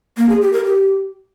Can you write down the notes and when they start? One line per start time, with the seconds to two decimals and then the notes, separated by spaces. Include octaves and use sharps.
0.17 A#3
0.29 G#4
0.41 G4
0.53 A#4
0.65 G4